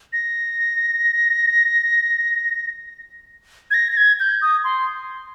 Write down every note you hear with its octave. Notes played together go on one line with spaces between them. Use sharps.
A#6
G#6
A#6
A#6
G#6
G6
D#6
C6